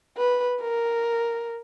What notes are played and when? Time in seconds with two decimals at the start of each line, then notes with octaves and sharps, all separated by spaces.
0.17 B4
0.61 A#4